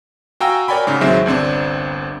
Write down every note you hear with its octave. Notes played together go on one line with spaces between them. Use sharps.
F#4 F5 G5 G#5 A#5 E6
A#4 C#5 D5 G5 G#5 B5
G#2 C#3
A1 D#3 F#3 G#3 C4 E5
G1 C2 C4 D4